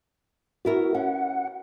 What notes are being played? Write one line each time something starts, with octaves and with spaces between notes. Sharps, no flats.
B3 E4 F#4 A#4
C#4 F#5